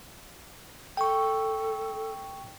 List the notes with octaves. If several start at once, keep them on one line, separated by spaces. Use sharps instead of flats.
A4 G5 C#6